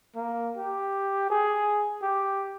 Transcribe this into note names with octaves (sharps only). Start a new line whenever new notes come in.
A#3
G4
G#4
G4